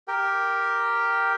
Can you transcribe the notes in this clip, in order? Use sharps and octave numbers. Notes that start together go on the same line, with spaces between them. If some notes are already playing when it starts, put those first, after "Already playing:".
G4 A#4 G5